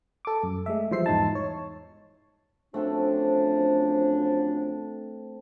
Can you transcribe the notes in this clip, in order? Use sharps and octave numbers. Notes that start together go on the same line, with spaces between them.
A4 D6
F#2
G#3 A3 E5
E3 F3 G3 C5 E5 C7
E2 G#2 D#4 A5
C#5
F#2 F3 A3 C4 D4 A4